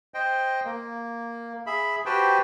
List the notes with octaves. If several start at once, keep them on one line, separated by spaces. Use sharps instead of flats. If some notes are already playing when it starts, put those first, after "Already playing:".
C5 D#5 G5
A#3
G#4 E5 B5
F#4 G4 B4 C5 G5 A5